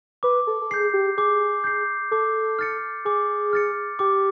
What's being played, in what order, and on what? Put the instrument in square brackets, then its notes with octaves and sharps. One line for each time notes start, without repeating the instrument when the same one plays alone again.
[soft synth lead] B4 [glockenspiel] D6
[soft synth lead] A4
A4
[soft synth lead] G#4 [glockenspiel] G6 C7
[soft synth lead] G4
[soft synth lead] G#4 [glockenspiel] D6
[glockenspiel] G6 C7
[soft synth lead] A4 [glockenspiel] D6
[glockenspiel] F6 A6 C#7
[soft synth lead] G#4 [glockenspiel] D6
[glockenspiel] F6 A6 C#7
[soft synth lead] G4 [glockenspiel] D6